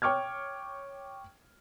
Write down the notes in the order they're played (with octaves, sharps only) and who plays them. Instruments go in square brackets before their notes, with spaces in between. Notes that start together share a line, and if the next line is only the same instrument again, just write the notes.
[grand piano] C#5 G5 C#6 D6 F6 G#6